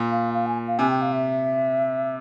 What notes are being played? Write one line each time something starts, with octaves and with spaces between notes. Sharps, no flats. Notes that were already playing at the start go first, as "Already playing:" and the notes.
Already playing: A#2
F5
F5
G#5
F5
C3 G#5
G5
F5
E5